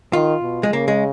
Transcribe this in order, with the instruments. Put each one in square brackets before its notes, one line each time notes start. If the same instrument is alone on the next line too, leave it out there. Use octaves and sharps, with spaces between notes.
[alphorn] D#3 [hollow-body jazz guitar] F4
[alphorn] B2
[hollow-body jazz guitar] G#3
[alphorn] C#3 [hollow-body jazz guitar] A#3
[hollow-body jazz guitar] G#3